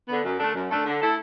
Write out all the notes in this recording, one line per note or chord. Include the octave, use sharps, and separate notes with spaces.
D3 B3
F#2
D3 A3 D4 A4
F#2
D3 A3 D4 A4
D3
A3 E4 A4